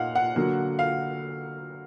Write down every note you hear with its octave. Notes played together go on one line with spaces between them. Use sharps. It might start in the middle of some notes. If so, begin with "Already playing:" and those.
Already playing: A#2 D#4 F5 F#5
F#5
D3 F#3 A#3
F5